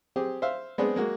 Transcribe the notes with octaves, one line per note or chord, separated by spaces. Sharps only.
C4 G4 G#4
C5 E5 F5
G#3 B3 C4 D4 G#4
G#3 A#3 F#4